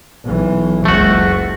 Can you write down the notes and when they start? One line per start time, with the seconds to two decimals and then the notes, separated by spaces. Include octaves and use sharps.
0.24 B1 E3
0.85 F#1 C#2 A3 F#4